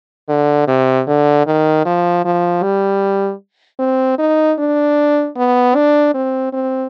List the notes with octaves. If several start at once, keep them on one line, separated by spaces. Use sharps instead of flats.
D3
C3
D3
D#3
F3
F3
G3
C4
D#4
D4
B3
D4
C4
C4